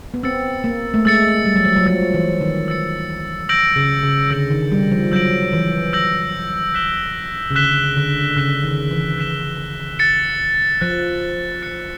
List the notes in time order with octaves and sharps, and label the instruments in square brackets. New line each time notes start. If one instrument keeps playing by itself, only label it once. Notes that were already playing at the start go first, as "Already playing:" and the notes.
[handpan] B3
[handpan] C4 [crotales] E6 A6 C#7
[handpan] A#3
A3
[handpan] G#3 [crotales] E6 A6 C#7
[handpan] G3
F#3
F3
F#3
[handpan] F3 [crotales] E6 A6 C#7
[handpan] E3
D#3
[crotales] E6 A6 C#7
E6 G6 A#6 D7 F#7
[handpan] C#3
C#3
[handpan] D3 [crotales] E6 G6 A#6 D7 F#7
[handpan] D#3
G3
F3
[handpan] F#3 [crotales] E6 G6 A#6 D7 F#7
[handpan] E3
[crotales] E6 G6 A#6 D7 F#7
F#6 B6 E7 G7
[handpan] C#3
[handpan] D3 [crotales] F#6 B6 E7 G7
[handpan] D3
[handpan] C#3 [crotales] F#6 B6 E7 G7
[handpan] D#3
E3
[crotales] F#6 B6 E7 G7
F#6 A6 C#7
[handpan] F3 [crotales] F#6 A6 C#7
[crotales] F#6 A6 C#7